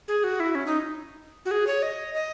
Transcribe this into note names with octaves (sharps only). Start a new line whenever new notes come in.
G#4
F#4
E4
C#4
D#4
F#4
G#4
C#5
D#5
D#5